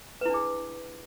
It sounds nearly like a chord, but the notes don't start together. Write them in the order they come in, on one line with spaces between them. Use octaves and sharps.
B4 E4 D4 G#4